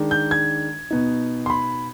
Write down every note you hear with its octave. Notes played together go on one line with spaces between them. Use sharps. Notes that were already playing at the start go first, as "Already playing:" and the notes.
Already playing: D#3 G#3 D4
G6
G#6
B2 B3 D#4
C6
B5